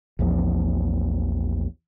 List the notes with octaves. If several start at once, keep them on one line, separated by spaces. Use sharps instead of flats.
A#1 E2 F3